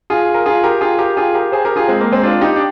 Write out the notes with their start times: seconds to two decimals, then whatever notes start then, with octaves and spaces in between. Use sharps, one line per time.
0.10 F4 G#4
0.34 A#4
0.46 F4 G#4
0.63 G4 A#4
0.81 F4 G#4
0.98 G4 A#4
1.17 F4 G#4
1.35 G4 A#4
1.52 G#4 C5
1.65 G4 A#4
1.76 F4 G#4
1.88 G#3 C4
2.01 A#3
2.12 G#3 C4
2.23 D4 F4
2.41 D#4 G4
2.56 D4